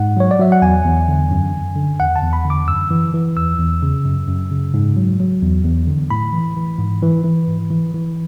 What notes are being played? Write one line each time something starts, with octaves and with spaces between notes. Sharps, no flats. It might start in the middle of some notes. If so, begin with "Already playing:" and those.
Already playing: G#2 F#5
F#3 C#5
D5
F#3 E5
F#5
E2 G#5
E2
D3
F#2
F#2
D3
E2 F#5
A5
E2
B5
D3
D6
F#2 E6
E3
E3
E2 E6
E2
C#3
F#2
F#2
C#3
G#2
F#3
F#3
E2
E2
D3
A2 B5
E3
E3
G#2
E3
E3
G#2
E3
E3